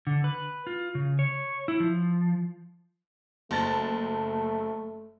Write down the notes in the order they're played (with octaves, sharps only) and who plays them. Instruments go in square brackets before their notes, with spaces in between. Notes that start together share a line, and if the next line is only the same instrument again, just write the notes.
[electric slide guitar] D3
B4
F4
C#3
C#5
E4
F3
[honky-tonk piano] F#1 A5 A6 [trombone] A3